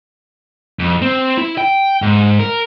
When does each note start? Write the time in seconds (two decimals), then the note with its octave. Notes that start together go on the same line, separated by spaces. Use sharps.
0.79 F2
1.02 C4
1.38 E4
1.58 G5
2.02 G#2
2.39 A#4